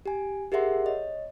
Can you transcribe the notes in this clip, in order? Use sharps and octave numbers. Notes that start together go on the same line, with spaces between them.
G4 G#5
G4 G#4 A#4 E5 F#5 C6
C#5 D#5